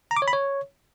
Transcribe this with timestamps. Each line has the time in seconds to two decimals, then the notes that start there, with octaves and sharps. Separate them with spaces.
0.11 A#5
0.17 D6
0.22 C#5
0.28 B5
0.33 C#5